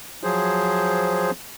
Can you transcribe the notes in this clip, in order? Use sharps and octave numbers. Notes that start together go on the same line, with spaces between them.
F3 F#3 G#4 C5